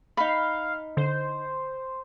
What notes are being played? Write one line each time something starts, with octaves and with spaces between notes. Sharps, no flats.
D#4 F5 B5
D3 C5